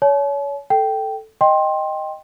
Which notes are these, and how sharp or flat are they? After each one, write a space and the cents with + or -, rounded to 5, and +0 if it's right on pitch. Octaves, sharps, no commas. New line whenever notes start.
C#5 +30 A5 -45
A4 +0 G5 -10
D#5 +0 G5 +0 C6 +20